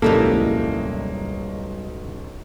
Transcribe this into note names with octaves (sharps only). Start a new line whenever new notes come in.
D1 B1 F#2 G3 G#3 A#3 E4 A4